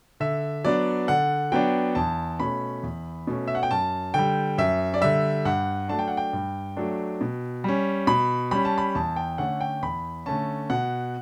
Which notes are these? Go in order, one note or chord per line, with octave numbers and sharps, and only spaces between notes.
D3 E5
F#3 B3 D4 D5
D3 F#5
F#3 B3 D4 G5
E2 A5
B2 A3 C#4 B5
E2
B2 A3 C#4
E5
F#5
G5
F#2 A5
D3 G3 G5
F#2 E5
D5
D3 G3 E5
G2 F#5
F#3 A3 D4 A5
G5
F#5
G5
G2
F#3 A3 D4
B2
G3 C#4
B2 B5
G3 C#4 B5
A5
B5
E2 A5
G5
D3 A3 C#4 F#5
G5
E2 B5
D3 A3 C#4 A5
B2 F#5